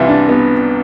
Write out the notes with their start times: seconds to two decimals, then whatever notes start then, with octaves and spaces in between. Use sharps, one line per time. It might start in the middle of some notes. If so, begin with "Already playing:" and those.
Already playing: C2 C3 E3 E4 F4
0.08 D4
0.29 B3